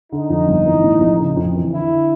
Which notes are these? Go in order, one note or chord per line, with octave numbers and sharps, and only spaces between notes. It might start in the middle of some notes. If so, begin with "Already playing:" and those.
D3 D#4
F2
G1
E3
A2
A#1
C#3
F2
E3
D3 E4